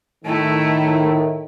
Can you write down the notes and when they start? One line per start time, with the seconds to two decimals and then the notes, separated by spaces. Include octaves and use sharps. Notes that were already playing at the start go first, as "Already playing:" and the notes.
0.25 A2 D#3 A3 E4